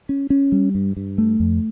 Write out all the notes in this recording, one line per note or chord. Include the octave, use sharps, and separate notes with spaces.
C#4
C#4
G3
G2
G2
A3
F2